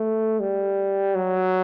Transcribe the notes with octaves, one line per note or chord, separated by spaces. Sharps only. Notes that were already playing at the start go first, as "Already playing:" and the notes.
Already playing: A3
G3
F#3